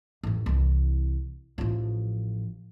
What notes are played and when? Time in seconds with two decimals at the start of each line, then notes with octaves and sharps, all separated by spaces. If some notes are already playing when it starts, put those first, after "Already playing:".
0.23 A1 F2
0.46 C2 E3
1.58 A1 F3